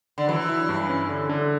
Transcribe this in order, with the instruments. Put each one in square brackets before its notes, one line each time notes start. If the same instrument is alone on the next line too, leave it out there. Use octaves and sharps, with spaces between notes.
[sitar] D3
[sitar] E3 [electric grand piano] F#3
[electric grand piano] E4
G2
C#4
D3
D3